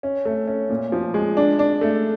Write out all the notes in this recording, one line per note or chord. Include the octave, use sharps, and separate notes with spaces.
C#4
A3
C#4
A#2
F3
G#3
D4
D4
A3